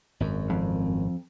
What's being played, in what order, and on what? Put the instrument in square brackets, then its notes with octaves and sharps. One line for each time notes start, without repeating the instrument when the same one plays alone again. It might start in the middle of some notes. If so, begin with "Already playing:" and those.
[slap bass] G#1 F#2
[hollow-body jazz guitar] F2